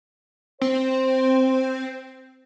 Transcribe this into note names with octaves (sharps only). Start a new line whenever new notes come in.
C4 C5